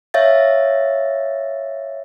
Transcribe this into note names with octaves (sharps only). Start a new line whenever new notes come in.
C#5 E5 F5 A6